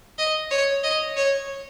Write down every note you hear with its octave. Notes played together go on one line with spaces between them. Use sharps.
D#5
C#5
D#5
C#5